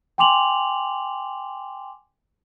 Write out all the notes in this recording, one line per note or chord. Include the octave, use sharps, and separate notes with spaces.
G5 G#5 C6 D6 F7 F#7